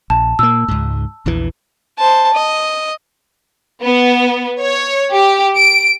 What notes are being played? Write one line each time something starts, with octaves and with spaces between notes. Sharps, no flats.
A#1 A5
A#2 A#3 E6
C#2 G#2
A#1 E2 E3
C5 A5
D#5
B3
C#5
G4
D7